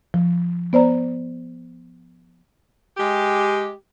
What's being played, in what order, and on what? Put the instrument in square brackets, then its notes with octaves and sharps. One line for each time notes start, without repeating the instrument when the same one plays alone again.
[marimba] F3
B3 C5 D5 A#5
[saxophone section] G#3 G4